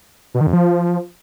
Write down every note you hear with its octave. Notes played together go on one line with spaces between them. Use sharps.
B2
D#3
F2
F3